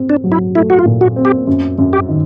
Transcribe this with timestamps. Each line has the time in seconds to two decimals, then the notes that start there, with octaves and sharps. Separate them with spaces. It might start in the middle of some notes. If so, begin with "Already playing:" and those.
Already playing: C4
0.10 D4
0.24 F#3
0.32 E4
0.55 A3 E4
0.70 F#4
0.79 F4
0.85 A#2
1.01 F#4
1.16 C4
1.25 G4
1.47 F#2
1.78 F#2
1.93 G4
2.09 D#3